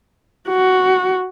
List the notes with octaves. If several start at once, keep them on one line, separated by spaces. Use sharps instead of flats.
F#4